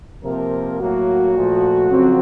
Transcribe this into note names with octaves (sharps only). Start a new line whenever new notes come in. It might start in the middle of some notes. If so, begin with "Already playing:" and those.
C3 F3 A#3 A#4
A2 F#3 A#3 F#4
A#2 F3 A3
F2 C#3 F#3 C4